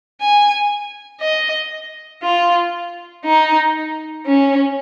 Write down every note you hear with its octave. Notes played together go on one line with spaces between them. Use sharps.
G#5
D#5
F4
D#4
C#4